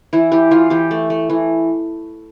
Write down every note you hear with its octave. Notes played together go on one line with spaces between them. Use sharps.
E3 E4
E3 G4
E3 F4
E3 G4
A3
A3
E3